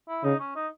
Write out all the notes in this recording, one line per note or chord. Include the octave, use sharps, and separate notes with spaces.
E4
C#3 D#4
C#4
D#4